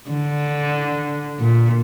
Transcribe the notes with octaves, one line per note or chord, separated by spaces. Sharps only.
D3
A#2